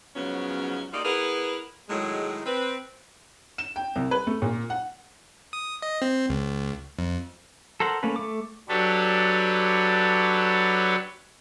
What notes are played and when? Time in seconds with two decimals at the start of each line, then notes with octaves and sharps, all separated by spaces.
0.16 G#2 C#3 F3 F#3 B3 C#4
0.93 G3 A#3 D#4 F4 G4 D5
1.05 B3 E4 G#4 A#4 B4
1.89 A2 D#3 F#3 G#3
2.46 C4 B4
3.58 E7
3.76 G5
3.96 C2
4.11 B4
4.27 A3
4.42 A#2
4.70 F#5
5.53 D#6
5.82 D#5
6.02 C4
6.29 C#2
6.99 F2
7.80 A4 A#4 C5 F#5
8.03 A3 A#3 C#4 B4
8.16 A3 D6
8.69 F#3 D4 G4 A4 B4 C#5